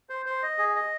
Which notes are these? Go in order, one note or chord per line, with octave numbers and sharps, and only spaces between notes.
C5
C5
D#5
G#4
D#5